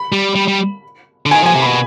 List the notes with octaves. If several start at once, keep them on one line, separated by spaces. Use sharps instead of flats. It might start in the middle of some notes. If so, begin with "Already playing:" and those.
Already playing: B5
G3
G3
G3
D3
G#5
D#3
F3 G#5
C3
B5
B2